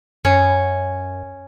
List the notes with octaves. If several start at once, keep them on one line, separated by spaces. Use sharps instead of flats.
F#2 C#4